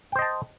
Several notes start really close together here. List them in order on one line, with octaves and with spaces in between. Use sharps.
G5 C5 D#5 A5